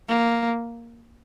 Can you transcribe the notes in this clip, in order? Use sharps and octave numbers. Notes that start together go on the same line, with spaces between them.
A#3